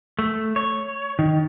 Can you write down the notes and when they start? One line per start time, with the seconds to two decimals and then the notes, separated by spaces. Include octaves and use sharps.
0.19 A3
0.56 C#5
1.19 D#3